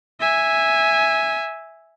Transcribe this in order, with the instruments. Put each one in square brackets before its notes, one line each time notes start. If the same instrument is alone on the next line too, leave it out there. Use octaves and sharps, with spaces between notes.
[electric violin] E5 G#5